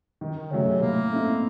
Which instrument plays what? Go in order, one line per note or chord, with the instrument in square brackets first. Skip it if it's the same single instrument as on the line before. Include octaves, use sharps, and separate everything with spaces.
[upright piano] D#3
[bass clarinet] D#3
[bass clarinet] C#3 [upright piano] F#3 A3 C#4
[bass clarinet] C3
[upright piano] A2 [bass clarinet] A#3
[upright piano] A3 C4 D#4